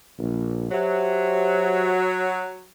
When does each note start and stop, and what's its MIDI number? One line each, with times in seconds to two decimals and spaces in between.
0.18 0.70 34
0.71 2.67 54
0.71 1.93 67
0.71 1.93 72
0.71 1.93 76